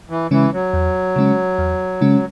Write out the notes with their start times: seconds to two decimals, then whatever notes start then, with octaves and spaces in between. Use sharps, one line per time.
0.10 E3
0.31 C#3 E3 G#3 C#4
0.53 F#3
0.73 E2
1.16 C#3 G#3 C#4
1.58 E2
2.01 C#3 G#3 C#4